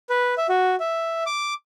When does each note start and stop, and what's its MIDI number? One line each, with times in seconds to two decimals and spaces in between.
0.10 0.34 71
0.38 0.47 76
0.49 0.75 66
0.80 1.24 76
1.26 1.54 86